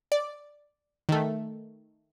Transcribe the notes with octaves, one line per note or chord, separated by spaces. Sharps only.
D5
D#3 A3